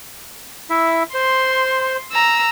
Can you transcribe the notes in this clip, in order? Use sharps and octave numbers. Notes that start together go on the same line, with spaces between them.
E4 E5
C5 C6
A#5 E6